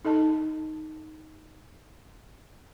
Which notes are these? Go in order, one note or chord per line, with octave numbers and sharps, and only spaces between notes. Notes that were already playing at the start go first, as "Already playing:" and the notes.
D#4 A4 D#5 A5